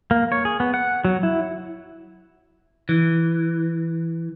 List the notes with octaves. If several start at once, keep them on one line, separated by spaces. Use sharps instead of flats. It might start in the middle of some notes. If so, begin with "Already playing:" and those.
A#3
C#5
G#4
B3
F#5
F#3
E4
E3